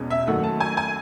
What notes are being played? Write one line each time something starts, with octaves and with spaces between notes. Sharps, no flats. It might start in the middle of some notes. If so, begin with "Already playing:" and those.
Already playing: E2 B2 G#3 C#4
E5
F#2 D#3 F#3 A3 F#5
A5
G#5
G#5